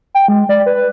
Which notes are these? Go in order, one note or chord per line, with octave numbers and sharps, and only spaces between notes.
G5
G#3
D5
B4